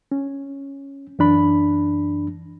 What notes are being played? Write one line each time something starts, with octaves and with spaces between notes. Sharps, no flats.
C#4
F#2 E3 D4 B5